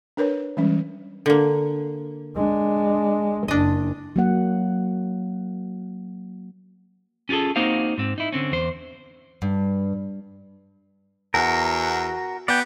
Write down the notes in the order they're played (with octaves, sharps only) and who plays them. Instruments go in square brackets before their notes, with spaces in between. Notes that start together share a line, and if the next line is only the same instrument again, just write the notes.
[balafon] D4 A#4 B4 C#5
E3 G3 G#3 C#4
[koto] D3 A#3
[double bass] G#3 D4
[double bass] F#1 [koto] D4 D#5
[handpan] F#3 A#3 F#5
[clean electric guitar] C#4 F4 F#4 G#4 A4
A#3 C4 D#4 F#4 C5 F5
G#2 C4
D#4 E4
D3 C4 C#4
E2 C5
[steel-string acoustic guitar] G2
[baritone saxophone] E2 [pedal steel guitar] F#4 A#4
[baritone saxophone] B3 [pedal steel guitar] D5 G5